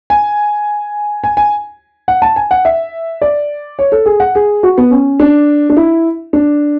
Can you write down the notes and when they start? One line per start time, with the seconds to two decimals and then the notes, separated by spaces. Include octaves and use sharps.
0.10 G#5
1.24 G#5
1.37 G#5
2.08 F#5
2.22 A5
2.36 G#5
2.51 F#5
2.65 E5
3.22 D5
3.79 C#5
3.92 A4
4.06 G#4
4.20 F#5
4.35 G#4
4.63 F#4
4.78 B3
4.91 C#4
5.20 D4
5.70 D4
5.77 E4
6.33 D4